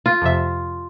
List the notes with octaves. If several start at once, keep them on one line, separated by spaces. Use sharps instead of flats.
F4
F2 C3 E5